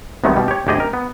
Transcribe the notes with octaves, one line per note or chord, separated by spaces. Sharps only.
C2 C3 D#3 F#3 A3 B3
B2 G3
G4 C#5
D2 G#2 G4 G#4 D5 D#5
A#4
B3